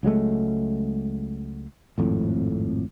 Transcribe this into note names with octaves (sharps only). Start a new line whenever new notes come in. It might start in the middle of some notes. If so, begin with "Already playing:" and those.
C#2 F#3 G#3 A3
G#1 F2 A2